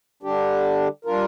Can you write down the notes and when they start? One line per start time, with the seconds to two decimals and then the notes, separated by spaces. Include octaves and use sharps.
0.23 D3 G3 D4 G4
1.05 G3 D4 F4 A#4